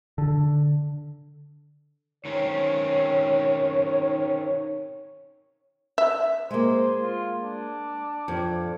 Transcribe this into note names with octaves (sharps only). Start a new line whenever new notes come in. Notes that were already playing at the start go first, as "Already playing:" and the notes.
D3
D#3 C4 C#4 C#5
E5
G#3 A#3 C5
F4
D4
F2